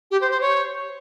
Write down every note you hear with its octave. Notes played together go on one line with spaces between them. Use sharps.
G4
C5
C5
C#5